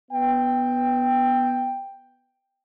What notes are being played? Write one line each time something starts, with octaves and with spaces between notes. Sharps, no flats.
B3 G5